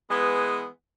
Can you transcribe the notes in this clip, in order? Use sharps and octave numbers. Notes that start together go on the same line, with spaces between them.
E3 G#3 B3